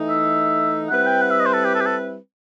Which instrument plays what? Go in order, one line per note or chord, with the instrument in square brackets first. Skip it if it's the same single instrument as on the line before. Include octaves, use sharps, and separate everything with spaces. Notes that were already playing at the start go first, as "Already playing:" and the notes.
Already playing: [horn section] E3 A3 D#4
[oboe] E5
[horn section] G3 C4 E4 B4 [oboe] F#5
[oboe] G5
F#5
E5
D#5
C5
A4
G4
A4
G4
A4